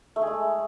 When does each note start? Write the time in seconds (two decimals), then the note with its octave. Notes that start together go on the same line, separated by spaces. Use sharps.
0.16 A3
0.21 G#4
0.27 G#3